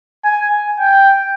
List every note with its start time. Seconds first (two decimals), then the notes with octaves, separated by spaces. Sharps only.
0.24 G#5
0.80 G5